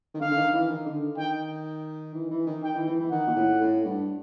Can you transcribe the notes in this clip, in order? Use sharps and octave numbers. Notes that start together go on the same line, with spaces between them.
D#3
D3 F5
D3
D#3
E3
D#3
D3
D#3 G5
E3
E3
D#3
D#3 G5
E3
E3
E3
D#3 F#5
A#2
A2
A2
G2